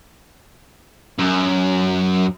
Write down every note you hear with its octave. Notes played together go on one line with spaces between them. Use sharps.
F#2